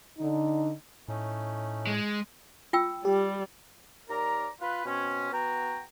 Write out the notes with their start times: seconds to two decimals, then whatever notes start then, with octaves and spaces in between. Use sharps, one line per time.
0.18 D3 D#4
1.08 A2 A3 C#4 D#4
1.87 G#3
2.73 F4 G5 E6
3.05 G3 G4
4.10 D#2 A#4 D5 A#5
4.61 F4 B4
4.86 B2 C4 C#4
5.32 B3 F#4 G5 A#5